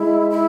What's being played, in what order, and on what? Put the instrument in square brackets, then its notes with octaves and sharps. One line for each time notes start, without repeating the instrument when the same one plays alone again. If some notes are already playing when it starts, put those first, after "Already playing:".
Already playing: [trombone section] G#3 [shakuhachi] E4
[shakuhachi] E4